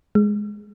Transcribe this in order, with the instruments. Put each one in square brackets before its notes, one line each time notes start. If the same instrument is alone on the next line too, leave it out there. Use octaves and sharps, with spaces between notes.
[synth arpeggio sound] G#3